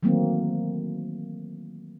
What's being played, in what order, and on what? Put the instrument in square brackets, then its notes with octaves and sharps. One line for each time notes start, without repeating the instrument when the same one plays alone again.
[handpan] D#3 E3 F#3 A3 A#3 C4